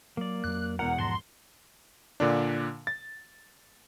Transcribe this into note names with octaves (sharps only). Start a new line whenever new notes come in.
F#3 A#3 D5
F2 F#3 F#6
E1 E2 A#4 F#5
G#2 F3 F#5 A5 A#5 C6
A#2 D3 D4
A6